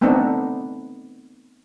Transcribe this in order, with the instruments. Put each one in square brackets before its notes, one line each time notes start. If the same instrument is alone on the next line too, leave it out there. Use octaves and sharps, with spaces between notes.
[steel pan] A3 B3 C4 D4 D#4